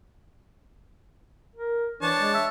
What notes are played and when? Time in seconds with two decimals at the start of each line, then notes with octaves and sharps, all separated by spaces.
1.56 A#4
2.02 E3 D4 C#5 A5
2.18 G#3
2.34 E5